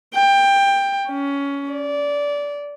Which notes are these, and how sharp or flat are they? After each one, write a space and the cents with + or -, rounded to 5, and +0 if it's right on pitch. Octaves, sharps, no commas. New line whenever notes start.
G5 +15
C#4 +15
D5 -20